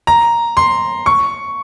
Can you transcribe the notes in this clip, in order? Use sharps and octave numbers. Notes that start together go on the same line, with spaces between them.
A#5
C6
C#6